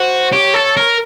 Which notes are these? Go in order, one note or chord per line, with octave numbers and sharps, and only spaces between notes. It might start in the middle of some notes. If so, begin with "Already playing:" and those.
Already playing: F#4 C5
G4 C#5
A4
A#4